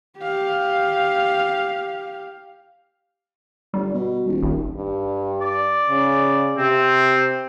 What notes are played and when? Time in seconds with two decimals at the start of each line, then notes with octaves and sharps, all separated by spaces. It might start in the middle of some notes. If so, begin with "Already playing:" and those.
0.20 G4 F5
3.74 G1 G3
3.94 B2
4.27 D#1
4.43 G#1
4.75 G2
5.41 D5
5.89 C#3
6.57 C3 C4